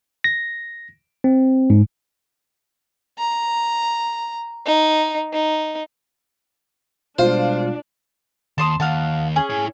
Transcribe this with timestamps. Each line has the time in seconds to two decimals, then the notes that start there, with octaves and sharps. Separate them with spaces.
0.24 A#6
1.24 C4
1.70 G#2
3.18 A#5
4.66 D#4
5.33 D#4
7.19 B2 G3 G#3 D4 F4 C5
8.58 D#2 A5 C6 D#6
8.80 D#2 F5 F#5 A5
9.36 C#4 G#4
9.50 E4 C#5